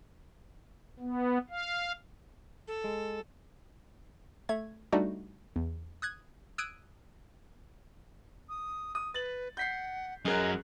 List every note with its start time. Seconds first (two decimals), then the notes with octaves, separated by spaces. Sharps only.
1.00 B3
1.50 F5
2.68 A4
2.84 G#3
4.49 A3 G#6
4.92 G3 A3 D4 D#4 F#4
5.56 E2
6.02 D#6 F#6 G#6
6.58 D#6 E6 F#6 G#6 D7 D#7
8.49 D#6
8.95 D#6
9.14 B4 A6 F#7
9.57 F#5 G6 B6 C7
10.25 F#2 F#3 G#4 A#4 D#5 F#6